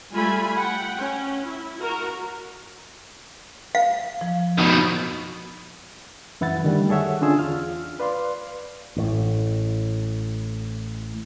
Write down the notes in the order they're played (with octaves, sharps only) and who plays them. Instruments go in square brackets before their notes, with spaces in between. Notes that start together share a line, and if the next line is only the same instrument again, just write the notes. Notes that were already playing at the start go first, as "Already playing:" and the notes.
[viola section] G3 A3 F4 G#5 B5
F#5 G5
C#4
E4
F#4 A#4
[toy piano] F5
[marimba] F3
[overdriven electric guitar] B2 D#3
[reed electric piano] F#2 E3 E4 F#5 A6
D3 D#3 G3 A3
G#4 A4 C#5 E5 F#5
D3 C#4 D4 F4 G#4 E6
E2 F4 F6
B4 D5 F5 C6
[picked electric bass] A1 A2